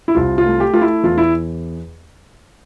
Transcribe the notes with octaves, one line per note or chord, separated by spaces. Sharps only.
E4
C2 F4
F4
A3
G4
A3 F4
E4
E2 F4
E4